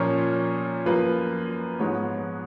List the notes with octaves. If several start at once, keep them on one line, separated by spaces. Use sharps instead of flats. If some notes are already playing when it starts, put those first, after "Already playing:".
Already playing: A#2 F3 A#3 C#4 C#5
F#2 F3 A#3 B4
G#2 F3 G#3 B3 C#5